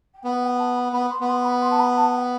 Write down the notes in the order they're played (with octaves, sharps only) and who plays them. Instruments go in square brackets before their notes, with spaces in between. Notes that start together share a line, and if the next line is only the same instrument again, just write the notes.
[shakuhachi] G5
[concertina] B3 [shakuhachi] F#5
[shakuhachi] G5
A5
B5
[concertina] B3 [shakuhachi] B5
[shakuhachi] C6
[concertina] B3
[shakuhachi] C6
B5
C6
A5
B5
A5
G5